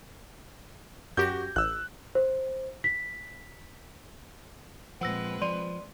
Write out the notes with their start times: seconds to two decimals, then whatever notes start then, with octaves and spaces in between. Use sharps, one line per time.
1.17 F#2 F#4 G4 G6 A#6
1.56 A1 E6 F#6
2.15 C5
2.84 B6
5.01 A#2 F3 G#3 C4 B4 F#5 E6 A#6
5.42 F3 D5 C6 D#7